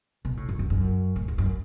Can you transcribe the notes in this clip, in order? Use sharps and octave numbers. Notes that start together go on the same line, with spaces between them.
B2
A2
F#2
F#2
F#2
A2
E2
F#2